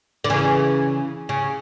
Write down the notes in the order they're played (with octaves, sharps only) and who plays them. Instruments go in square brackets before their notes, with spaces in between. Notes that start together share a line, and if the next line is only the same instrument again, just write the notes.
[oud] D3
C#3 E3
C#3